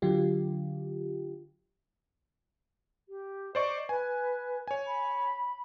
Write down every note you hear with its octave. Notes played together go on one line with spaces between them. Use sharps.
D3 F#3 F4 G4
G4
C5 D5 D#5 C#6
B4 G#5
C#5 G#5
B5